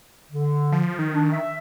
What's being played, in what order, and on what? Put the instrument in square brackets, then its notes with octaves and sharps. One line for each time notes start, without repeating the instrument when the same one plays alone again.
[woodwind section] D3
[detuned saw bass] F3
D#3
[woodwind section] D4
E5